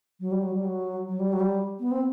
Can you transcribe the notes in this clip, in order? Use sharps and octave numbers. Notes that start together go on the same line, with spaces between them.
F#3
G3
F#3
G3
F#3
F#3
G3
F#3
G3
B3
C4